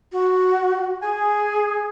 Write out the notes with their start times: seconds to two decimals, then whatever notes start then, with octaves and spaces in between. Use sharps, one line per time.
0.12 F#4
1.03 G#4 G#5